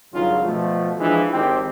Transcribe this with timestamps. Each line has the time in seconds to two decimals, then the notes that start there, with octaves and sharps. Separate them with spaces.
0.13 G#1 G2 C#3 F#3 F4
0.44 B2 F3 A3
0.99 E3 F3 G#3 D4
1.33 G#1 D#3 C4 G4